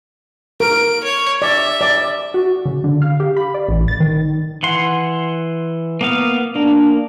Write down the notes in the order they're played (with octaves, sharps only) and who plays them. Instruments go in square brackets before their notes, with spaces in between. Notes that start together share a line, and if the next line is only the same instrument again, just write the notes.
[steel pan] A#4 [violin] D7
[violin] C#5
[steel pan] D5 [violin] E5
[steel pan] D5
[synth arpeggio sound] F#4
C#3
D3
F5
G4
B5
D5
A1
A6
D#3
[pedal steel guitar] E3 F#5 C6
A#3 B3 F5
[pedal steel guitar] A#3 [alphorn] D4